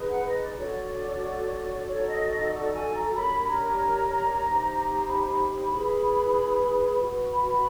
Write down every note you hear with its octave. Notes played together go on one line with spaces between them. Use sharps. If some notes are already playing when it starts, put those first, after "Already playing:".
Already playing: D#4 G#4 B4
F#5
D#5
D5
D4 F#4 A4 C#5
D#4 F#4 A4 C#5
D#5
D#5
D5
G#5
A#5
D4 G4 A#4 C#5 B5
A#5
D#4 G4 C5
B5
E4 G#4 B4
F#4 B4
B5